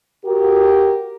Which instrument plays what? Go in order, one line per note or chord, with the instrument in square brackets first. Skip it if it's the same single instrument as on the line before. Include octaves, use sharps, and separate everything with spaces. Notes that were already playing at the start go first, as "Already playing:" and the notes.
[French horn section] F#4 G4 A#4